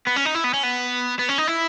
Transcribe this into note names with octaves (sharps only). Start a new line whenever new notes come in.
B3
C#4
D#4
E4
B3
C#4
B3
B3
C#4
D#4
E4